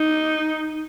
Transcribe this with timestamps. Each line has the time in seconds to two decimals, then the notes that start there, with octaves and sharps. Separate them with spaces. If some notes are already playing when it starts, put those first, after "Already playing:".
Already playing: D#4